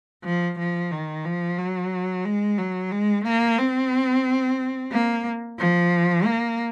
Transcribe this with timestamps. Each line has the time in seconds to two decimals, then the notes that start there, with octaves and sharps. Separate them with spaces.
0.24 F3
0.58 F3
0.91 D#3
1.25 F3
1.57 F#3
2.25 G#3
2.58 F#3
2.91 G#3
3.25 A#3
3.58 C4
4.92 A#3
5.59 F3
6.25 A#3